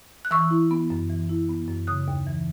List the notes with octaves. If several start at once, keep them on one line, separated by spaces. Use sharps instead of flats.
F#6
E3 C#6 E6
E4
B3
F#2
E3
E4
B3
F#2
C#3 D#6 F#6
D#2
E3